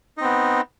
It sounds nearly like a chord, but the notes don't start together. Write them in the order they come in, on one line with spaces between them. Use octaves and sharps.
D#4 C4 B3